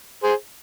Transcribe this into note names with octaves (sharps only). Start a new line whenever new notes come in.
G#4 C5